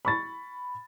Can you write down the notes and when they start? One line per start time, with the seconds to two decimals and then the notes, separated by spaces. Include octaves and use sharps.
0.05 B5 C#6 A6